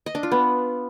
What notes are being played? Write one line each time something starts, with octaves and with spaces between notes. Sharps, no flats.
D#5
D4
F4
B3